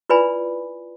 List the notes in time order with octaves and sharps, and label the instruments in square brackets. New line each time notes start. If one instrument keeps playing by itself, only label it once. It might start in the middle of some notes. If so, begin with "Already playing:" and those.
[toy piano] E4 F4 B4 D5 G#5 B5